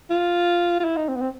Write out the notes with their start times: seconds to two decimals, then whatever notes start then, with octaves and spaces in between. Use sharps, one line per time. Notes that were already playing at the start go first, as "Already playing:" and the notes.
0.10 F4
0.80 F4
0.84 E4
0.97 D#4
1.09 C4
1.16 B3
1.22 C4